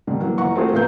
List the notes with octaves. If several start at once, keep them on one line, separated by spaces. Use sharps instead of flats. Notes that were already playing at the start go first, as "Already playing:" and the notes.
D3 D#3 G3
E3 F#3 A#3
G1 E3 F#5 A#5 C#6
A3 C4 F4 F#4 G#4 A#4
A#1 B3 F5 A#5 G6